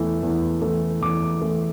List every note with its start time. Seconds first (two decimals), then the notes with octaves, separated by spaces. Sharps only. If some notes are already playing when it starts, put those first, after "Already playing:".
Already playing: E2 E3 A3
0.23 E2
0.62 E3 A3
1.01 E2 D6
1.42 E3 A3